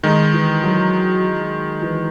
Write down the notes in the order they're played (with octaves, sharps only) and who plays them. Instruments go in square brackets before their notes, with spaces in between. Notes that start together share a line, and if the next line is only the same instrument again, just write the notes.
[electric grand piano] D#3 G#3 D#4
[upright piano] E3
F#3
E3